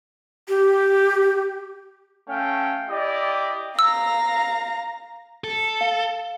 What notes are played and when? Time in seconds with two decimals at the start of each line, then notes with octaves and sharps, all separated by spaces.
0.49 G4
2.29 A3 C#4 F5 G5
2.89 E4 G4 D5 D#5
3.79 F5 A#5 E6
5.44 A4
5.81 F5